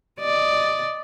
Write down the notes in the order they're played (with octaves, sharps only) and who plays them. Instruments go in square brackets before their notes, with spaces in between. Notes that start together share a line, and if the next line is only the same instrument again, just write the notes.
[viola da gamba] D5 D#5